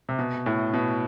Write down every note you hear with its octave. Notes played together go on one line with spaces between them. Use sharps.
C3
B2
A2
B2